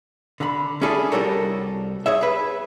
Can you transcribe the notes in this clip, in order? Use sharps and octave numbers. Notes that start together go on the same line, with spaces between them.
D3 B5
C#4 D4 E4 G#4 A4
C2 G3 F#4 A4 A#4 C#5
G#4 C#5 E5
G#4 B4